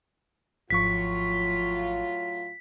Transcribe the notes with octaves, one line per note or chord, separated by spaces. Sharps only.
G#1 A2 F3 F#3 F4 C#6 B6